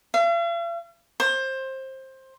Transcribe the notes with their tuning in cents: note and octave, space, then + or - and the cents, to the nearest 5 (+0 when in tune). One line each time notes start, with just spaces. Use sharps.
F5 -45
C5 +20